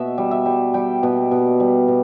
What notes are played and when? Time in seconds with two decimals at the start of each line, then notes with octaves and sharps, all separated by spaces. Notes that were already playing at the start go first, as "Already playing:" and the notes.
Already playing: B2 E5
0.18 G3
0.31 E5
0.46 G3
0.74 G3 G5
1.03 B2
1.31 B2
1.60 G3
1.88 B2